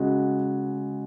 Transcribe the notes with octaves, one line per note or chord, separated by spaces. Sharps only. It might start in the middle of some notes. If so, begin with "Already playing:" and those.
Already playing: C#3 G#3 F#4